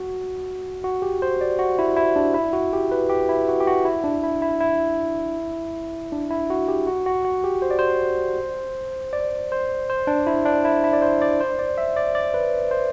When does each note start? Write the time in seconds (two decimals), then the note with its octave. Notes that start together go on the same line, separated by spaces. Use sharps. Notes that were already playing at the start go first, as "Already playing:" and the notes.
Already playing: F#4
0.84 F#4
1.02 G4
1.22 C5
1.41 D5
1.59 F#4
1.79 E4
1.97 E4
2.16 D4
2.34 E4
2.53 F#4
2.73 G4
2.92 B4
3.10 G4
3.29 E4
3.48 F#4
3.60 G4
3.67 F#4
3.85 E4
4.04 D4
4.24 E4
4.42 E4
4.60 E4
6.12 D4
6.30 E4
6.50 F#4
6.68 G4
6.87 F#4
7.06 F#4
7.25 F#4
7.44 G4
7.62 C5
7.71 D5
7.79 C5
9.13 D5
9.52 C5
9.90 C5
10.07 D4
10.27 E4
10.45 D4
10.65 E4
10.84 E4
10.93 D5
11.02 C5
11.22 D5
11.40 C5
11.59 D5
11.78 E5
11.97 D5
12.15 D5
12.34 B4
12.71 C5